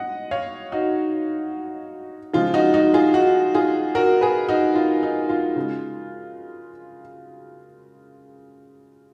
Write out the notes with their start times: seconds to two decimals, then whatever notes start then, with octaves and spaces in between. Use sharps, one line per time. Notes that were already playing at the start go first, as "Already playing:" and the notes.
Already playing: D#5 F#5
0.31 C#5 F5
0.72 D#4 F#4
2.34 C#3 F3 G#3 F4
2.54 D#4 F#4
2.74 D#4 F#4
2.94 F4 G#4
3.14 D#4 F#4
3.54 F4 G#4
3.95 F#4 A#4
4.21 G#4 B4
4.48 D#4 F#4
4.75 F4
5.03 D#4
5.29 F4
5.56 C#3 G#3